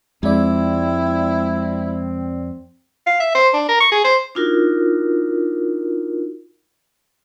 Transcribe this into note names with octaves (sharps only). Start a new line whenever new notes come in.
F2 G#3 C4 E4 D5
F5
E5
C5
D4
A#4
C#6
G#4
C5
D4 D#4 F4 F#4 A#4